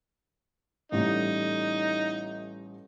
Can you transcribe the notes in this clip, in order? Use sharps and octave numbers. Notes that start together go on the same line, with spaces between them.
A1 A2 G3 D#4